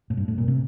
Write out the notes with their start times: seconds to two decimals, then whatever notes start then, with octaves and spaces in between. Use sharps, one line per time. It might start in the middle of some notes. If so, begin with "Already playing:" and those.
0.10 A2
0.17 G2
0.28 A2
0.38 A#2
0.48 C3